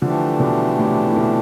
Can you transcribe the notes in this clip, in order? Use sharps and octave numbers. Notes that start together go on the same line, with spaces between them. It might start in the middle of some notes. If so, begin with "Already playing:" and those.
D3 E3 F3 A3 D4 G4
B2 D3
A2 C3
A2
B2